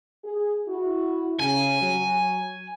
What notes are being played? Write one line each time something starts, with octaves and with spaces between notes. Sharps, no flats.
G#4
E4 F#4
C#3 G#5
F#3